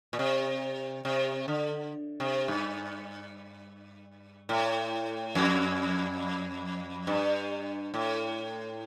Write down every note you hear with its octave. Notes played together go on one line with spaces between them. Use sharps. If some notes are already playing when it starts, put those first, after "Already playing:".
A#2
C3
C3
D3
C3
G2
A2
F2
G2
A2